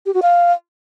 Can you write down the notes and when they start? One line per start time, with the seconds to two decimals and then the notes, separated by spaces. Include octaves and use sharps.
0.06 G4
0.14 F#4
0.22 F5